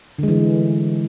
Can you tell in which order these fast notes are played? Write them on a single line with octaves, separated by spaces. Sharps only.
D3 G#3 E3